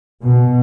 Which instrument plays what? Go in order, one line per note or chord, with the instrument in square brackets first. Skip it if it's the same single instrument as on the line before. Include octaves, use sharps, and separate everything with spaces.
[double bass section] B2